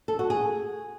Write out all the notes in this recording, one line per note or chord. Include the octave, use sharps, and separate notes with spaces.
A4
F#4
G#4